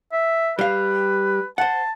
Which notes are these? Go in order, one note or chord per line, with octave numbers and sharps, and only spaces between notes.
E5
G3 B4 F5
C5 F#5 A5